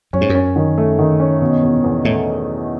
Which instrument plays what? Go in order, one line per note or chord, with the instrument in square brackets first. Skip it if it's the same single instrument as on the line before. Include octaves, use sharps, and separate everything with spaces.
[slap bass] F#2 [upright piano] C#4
[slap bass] G#2
F#2
[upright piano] C#4
D#3
A3
D#3
C#4
B2
E2
E2
[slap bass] A2 [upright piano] A3